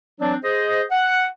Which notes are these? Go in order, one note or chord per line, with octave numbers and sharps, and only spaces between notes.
E3 F#3 C4 D4
G#4 C5 D#5
F#5